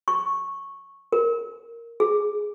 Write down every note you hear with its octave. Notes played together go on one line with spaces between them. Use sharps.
C#6
A#4
G#4